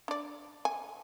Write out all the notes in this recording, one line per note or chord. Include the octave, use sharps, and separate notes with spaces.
D4 D5
G#5